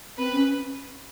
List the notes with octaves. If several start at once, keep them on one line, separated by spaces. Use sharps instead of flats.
C4 B4
C#4